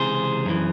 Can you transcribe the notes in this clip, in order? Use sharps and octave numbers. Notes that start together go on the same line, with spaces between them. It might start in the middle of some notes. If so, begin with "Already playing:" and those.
Already playing: C#2 C3 E3 G#4 C5
F#2 E3